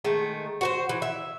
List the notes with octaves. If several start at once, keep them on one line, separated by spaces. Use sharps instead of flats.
D#3 G#3 A3
F#4 B4 C5
E3
E5